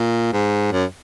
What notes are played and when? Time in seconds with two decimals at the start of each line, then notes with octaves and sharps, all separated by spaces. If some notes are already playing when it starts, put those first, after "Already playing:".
Already playing: A#2
0.32 G#2
0.72 F#2